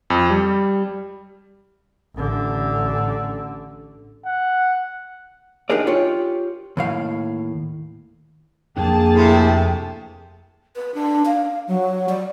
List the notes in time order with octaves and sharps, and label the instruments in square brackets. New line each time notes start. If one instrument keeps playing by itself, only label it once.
[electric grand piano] F2
G3
[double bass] A1 D3
[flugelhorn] F#5
[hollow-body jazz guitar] D4 D#4 G4 G#4 A#4 D5
F4 G4 C#5
D#2 A2 F5
[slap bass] F2 D4 [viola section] A#3 G#4 A5 [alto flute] G5
[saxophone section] A2 C3
[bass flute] B4
D4
F5
F#3
D5